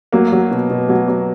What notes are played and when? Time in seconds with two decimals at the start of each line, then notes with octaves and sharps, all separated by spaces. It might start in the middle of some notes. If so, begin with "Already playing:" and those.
0.12 F#3 A#3
0.32 F#3
0.51 B2
0.70 B2
0.89 F#3
1.08 F#3